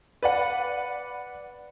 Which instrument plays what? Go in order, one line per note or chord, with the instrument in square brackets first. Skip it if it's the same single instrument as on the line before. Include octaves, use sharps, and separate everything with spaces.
[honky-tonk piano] B4 D5 F#5